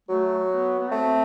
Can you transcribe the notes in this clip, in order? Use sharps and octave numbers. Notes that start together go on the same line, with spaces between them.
F#3 A3
B3
B3
A3 C4